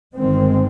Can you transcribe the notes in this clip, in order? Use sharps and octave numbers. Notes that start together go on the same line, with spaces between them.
G1 G2 D#3 G#3 C4